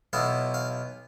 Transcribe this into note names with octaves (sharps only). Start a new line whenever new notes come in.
B1 B2 B3 E4 F5
F5